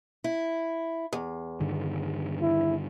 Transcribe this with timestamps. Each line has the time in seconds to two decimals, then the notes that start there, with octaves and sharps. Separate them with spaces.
0.24 E4
1.13 E2
1.60 G2 D3 D#3
2.41 E4